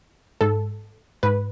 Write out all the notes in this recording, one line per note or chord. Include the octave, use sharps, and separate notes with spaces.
G#2 A4
G#2 B4